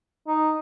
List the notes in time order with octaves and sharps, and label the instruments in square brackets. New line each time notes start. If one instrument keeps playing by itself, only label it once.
[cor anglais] D#4